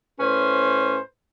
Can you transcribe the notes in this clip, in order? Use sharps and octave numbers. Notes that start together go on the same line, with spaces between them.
A2 C#4 B4 C5